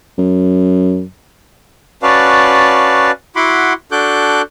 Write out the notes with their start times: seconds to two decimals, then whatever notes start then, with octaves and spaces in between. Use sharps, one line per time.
0.18 F#2
2.03 C#4 F#4 B4 D5 F5 A5
3.36 E4 F#4 F#5 B5 C6 D6
3.92 D4 F#4 A4 D6 F#6 G6